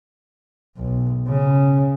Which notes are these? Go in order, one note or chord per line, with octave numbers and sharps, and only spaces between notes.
B1
C#3